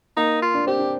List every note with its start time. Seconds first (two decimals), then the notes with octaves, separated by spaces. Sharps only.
0.17 A#3 D#4
0.42 F4
0.54 D4
0.67 C4 G4
0.79 D4